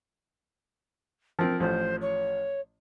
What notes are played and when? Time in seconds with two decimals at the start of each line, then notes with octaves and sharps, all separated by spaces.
1.39 F3 C4 A#4
1.60 A1 F3 C5
2.01 C#5